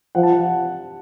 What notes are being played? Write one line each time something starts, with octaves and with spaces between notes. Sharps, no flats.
F3 F#5
A5
F#5